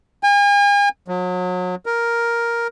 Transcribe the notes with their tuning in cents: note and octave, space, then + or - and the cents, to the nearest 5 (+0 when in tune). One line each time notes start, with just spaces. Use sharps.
G#5 -40
F#3 -35
A#4 +5